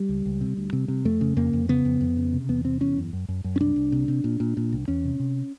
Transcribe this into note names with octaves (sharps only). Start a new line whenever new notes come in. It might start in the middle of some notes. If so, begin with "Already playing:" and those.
Already playing: G3
C#2
C#2
C3
D2
C3
C3
F2 A3
C#3
F2 A#3
F2
C#3 B3
F2
F2
C#3
C3
E2 B3
C3 C4
E2 C#4
F#2
F#2
F#2
F#2
C#4
C2 D4
C2
C3
C3
A#2
A#2
A#2
C2
E2 C#4
C3
C3